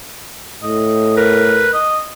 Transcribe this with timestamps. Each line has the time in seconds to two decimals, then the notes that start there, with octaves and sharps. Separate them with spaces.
0.62 A2 D#5
1.17 A#4 B4
1.73 D#5